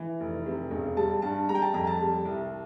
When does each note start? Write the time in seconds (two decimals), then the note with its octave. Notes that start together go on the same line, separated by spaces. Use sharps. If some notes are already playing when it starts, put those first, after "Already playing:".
Already playing: E3
0.20 F1
0.46 C3
0.71 E1
0.97 G3 A5
1.22 G2 A5
1.49 G3 A#5
1.55 G5
1.62 A5
1.74 F2 A#5
1.87 A5
2.01 G3
2.25 C2